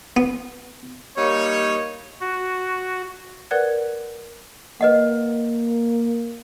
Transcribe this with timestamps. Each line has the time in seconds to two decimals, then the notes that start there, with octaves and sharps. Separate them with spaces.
0.17 B3
1.17 G3 A#3 D#4 C#5
2.20 F#4
3.51 A#4 B4 D5 F#5 F#6 G#6
4.81 A#3 B4 D#5 F#5